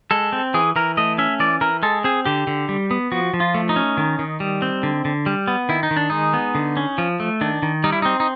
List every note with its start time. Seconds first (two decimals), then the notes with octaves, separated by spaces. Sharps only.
0.11 G#3 A4
0.33 C4
0.54 E3 G#4
0.76 E3 A#4
0.97 A3 D#5
1.18 C#4 E5
1.40 E3 D5
1.61 E3 A#4
1.83 G#3 A4
2.04 C4 G#4
2.25 D3 G4
2.47 D3
2.69 G3
2.91 B3
3.12 F3 F#4
3.34 F3
3.40 F4
3.54 A3
3.69 D#4
3.76 C#4
3.97 D#3
4.19 D#3
4.40 G3
4.62 C4
4.83 D3
5.05 D3
5.26 G3
5.48 B3
5.69 D#3 E4
5.83 D#4
5.91 D#3
5.97 D4
6.10 G#3 D#4
6.34 B3
6.55 D3
6.77 C#4
6.98 F3
7.20 A3
7.41 D#3 D4
7.63 D#3
7.84 G3 D#4
7.92 E4
8.02 C4 D#4
8.20 D#4